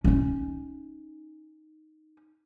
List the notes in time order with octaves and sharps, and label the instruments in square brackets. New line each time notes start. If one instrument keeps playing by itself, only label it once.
[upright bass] C#4 D#4